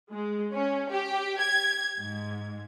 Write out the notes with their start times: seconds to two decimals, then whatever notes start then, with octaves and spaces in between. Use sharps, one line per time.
0.10 G#3
0.52 C#4
0.91 G4
1.41 G#6
1.99 G#2